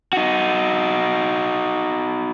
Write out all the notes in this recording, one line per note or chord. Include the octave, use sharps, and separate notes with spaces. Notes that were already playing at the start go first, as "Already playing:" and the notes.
D#4 F#4